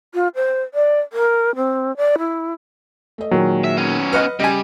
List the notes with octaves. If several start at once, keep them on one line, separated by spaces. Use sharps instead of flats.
F4
C5
D5
A#4
C4
D5
E4
A3 D#5
A#2 D#3 F#3 G#3
E5
B3 C#4
B4 D#5 F#5 F6
C#3 G3 D#5 G#5